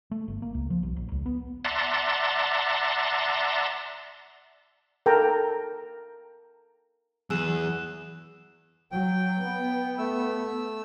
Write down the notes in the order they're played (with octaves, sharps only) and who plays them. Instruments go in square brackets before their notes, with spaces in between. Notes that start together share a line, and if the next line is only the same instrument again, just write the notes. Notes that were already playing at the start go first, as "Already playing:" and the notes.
[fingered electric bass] A3
G1
A#3
C#2
F3
B1
A#1
C#2
B3
[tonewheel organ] D5 E5 F#5 A5 A#5 C6
[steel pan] A4 A#4 G5 A5 A#5
[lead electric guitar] E2 [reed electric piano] E3 F#3 [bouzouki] G#4 [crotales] E6 F#6 E7
[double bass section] F#3 [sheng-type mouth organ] G5
[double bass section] B3
[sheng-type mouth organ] A3 E6